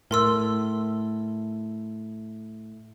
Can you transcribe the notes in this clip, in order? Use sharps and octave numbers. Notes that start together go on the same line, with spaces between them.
A2 A#4 C6 E6